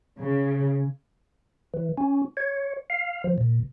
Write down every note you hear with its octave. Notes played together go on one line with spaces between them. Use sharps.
C#3
E3
C#4
C#5
F5
F3
A#2